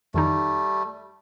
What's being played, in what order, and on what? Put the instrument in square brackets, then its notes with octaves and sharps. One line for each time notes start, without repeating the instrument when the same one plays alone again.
[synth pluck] F2 D#3 D#4 [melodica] G3 A3